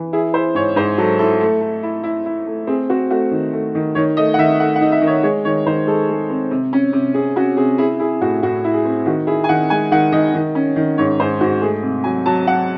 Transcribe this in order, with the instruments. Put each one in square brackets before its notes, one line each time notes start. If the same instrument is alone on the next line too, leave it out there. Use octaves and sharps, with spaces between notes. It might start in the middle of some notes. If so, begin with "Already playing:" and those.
Already playing: [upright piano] E3
E4 G#4
E4 C5
G#2 C#5
G#2 C5
F#3 A4
E4 A4
A3
A3
E4
E4
E4
A3
C4 G#4
C4 F#4
A3 F#4
D#3
A3
D#3
D#3 C#5
A3 D#5
F#5
D#3 E5
A3 F#5
F#5
D#4
E5
D#3
C#5
G#3 C#5
D#3 C#5
D#3 C5
G#3 A4
G#3
C4
C3
C#4
C3
C3 G#4
C#4 F#4
C3 G#4
E4 G#4
E4 G#4
A2 F#4
A2 F#4
E4
G#4
C4
D#3 F#4
E4 G#4
G#5
D#3 F#5
G#3 G#5
D#3 F#5
D#3 D#5
D#3
C#4
D#3
G#2 C#5
G#2 C5
G#2 F#4
A3 G#4
C3
F#3 G#5
F#3 A5
F#3 F#5